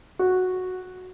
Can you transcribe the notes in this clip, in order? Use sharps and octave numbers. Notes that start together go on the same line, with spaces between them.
F#4